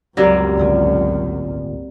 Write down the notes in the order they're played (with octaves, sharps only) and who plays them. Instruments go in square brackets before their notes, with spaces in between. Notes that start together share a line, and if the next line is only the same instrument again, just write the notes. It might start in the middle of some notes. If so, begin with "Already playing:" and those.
[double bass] C#2 F#2 [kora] C3 F#3 A#3 [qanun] G3
[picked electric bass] G#1 D2 A#2